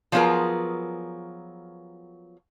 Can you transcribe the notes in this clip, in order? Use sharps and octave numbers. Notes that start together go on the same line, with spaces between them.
F3 F#3 B3 F4 G#4 A#4